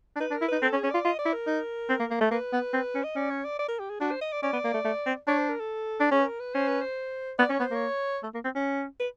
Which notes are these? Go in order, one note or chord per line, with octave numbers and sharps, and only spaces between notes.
D4
D#4 B4
D4
A#4
E4
D#4 B4
C4 A4
C#4
G#4
C#4
F4 D5
F4 D#5
D5
E4
A#4
D#4
C4
A#3
A#3
A3
A#3 B4
B3
C4
C#4
D#5
C#4 D5
C#5
D5
D5
A#4
G4
G#4
D4 F#4
C5
D#5
D5
C#4 D5
B3
A#3
A3
A3
C4
D4 C#5
C5
A#4
A4
D4
C#4 G#4
B4
A#4
B4
C#4 C5
B4
C5
B3 D5
C#4 C#5
B3
C5
A#3 C#5
A3
A#3
C4
C#4
B4